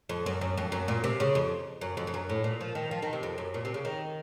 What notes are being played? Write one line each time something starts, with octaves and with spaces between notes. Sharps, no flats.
F2
F#2
F#2
F2
F#2
A#2
C3
C#3
F2
F#2
F2
F2
F#2
A2
A#2
F3
D#3
F3
D#3
C3
F2
F#2
A#2
C3
C#3
D#3